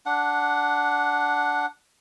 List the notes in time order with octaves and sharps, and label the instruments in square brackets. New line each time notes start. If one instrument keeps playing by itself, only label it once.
[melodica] D4 F#5